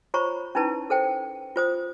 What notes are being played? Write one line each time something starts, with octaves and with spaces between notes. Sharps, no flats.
F4 C5 C#5 A#5 B5 C#6
C#4 D#4 E4 B4 A5
A4 C5 G5
F4 C5 D#6